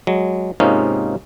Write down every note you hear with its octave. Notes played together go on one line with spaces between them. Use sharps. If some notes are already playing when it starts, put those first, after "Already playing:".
F#3 G#3
G#2 C3 A#3 C#4 D#4 F4